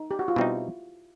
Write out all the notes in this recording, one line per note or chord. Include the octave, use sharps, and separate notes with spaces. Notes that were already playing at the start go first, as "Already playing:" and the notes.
Already playing: D#4
G4
F#4
F4
B2 G3 C4 D#4 E4